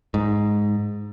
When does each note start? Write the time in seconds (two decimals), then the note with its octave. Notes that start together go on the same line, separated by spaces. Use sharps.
0.14 G#2